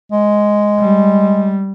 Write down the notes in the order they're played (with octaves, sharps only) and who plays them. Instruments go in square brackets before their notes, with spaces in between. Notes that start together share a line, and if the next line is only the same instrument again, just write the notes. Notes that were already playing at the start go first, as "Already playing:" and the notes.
[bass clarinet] G#3
[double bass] G3